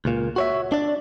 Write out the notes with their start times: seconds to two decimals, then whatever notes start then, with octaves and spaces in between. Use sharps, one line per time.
0.05 C#2 A#2
0.36 F#4 C#5 E5
0.72 D4 D5